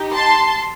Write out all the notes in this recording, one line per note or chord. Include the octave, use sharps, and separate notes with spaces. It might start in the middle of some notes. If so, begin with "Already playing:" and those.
Already playing: D#4 G4
A5 C6